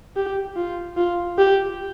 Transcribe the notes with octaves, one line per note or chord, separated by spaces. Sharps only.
G4
F4
F4
G4